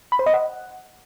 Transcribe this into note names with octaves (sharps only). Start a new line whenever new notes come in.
B5
C5
D#5
F#5